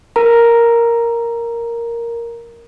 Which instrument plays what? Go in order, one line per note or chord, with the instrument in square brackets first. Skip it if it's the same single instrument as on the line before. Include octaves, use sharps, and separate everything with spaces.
[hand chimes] A#4 A#5